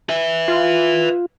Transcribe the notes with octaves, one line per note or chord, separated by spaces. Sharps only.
B4 E5
F4